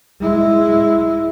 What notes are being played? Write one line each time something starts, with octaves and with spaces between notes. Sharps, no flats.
G#3 E4